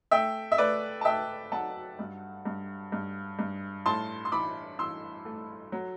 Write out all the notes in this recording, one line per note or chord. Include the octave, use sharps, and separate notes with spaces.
A3 E5 G5
E5
A3 B4 D5
A5
A3 E5 G5
F#3 F#5 A5
G2
G2
G2
G2
A2 A5 C6
C6
E3 B5 D6
E3 C6 E6
A3
F#3